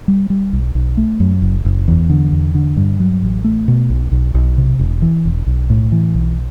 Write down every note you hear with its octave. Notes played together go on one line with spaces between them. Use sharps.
G3
G3
B1
B1
A3
F#2
F#1
F#1
E2
D3
E2
D3
G2
F#3
A1
A3
B2
B1
B1
B1
C3
E1
E3
E1
B1
A2
E3
B1